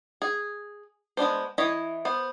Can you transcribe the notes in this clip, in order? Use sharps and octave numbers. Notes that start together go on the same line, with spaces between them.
G#4
G#3 B3 D4 C5
E3 E4 C#5 D#5
B3 C5